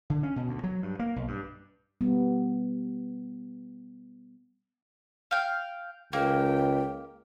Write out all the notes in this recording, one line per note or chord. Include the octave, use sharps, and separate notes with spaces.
D3
C#4
B2
D2
F#3
G2
A#3
B1
G2
G3 B3
F5 G5
C#2 A#3 G5